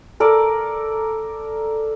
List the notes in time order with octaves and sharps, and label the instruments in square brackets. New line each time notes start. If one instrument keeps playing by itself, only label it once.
[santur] A4 A#4 D5